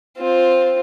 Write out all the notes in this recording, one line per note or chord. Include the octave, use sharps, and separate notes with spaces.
C4 F4